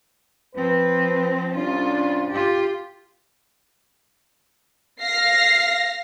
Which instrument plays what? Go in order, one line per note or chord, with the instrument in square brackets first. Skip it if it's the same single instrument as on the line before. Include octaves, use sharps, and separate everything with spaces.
[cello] F3 C4 [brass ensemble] B4
[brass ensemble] C2 D4 [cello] C#4 F4
[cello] F4 G4
[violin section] F5 A#6 C7